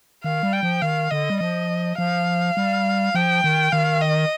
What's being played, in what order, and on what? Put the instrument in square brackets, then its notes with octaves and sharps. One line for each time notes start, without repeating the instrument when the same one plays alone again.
[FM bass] D#3 [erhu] F5
[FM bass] G3
[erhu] G5
[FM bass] F3
[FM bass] D#3 [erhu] F5
[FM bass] D3 [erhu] D#5
[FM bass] G3
[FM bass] F3 [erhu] D#5
[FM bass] F3 [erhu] F5
[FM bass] G3
[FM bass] F3 [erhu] G5
[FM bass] D#3
[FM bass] D#3 [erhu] F5
[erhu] D#5